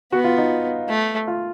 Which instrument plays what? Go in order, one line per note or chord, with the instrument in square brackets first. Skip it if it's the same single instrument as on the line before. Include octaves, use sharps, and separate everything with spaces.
[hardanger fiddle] B3 [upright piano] F#4
[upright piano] F4
D#4
[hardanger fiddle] A3
[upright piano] F4